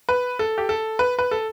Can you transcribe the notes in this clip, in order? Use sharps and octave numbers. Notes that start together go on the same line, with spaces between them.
B4
A4
G4
A4
B4
B4
A4